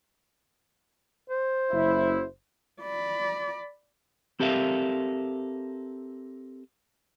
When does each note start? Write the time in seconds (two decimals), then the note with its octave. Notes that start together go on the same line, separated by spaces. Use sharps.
1.30 C5
1.71 F#1 E4
2.82 D5 B5
4.40 C4 G4 A4 A#4 E5 F5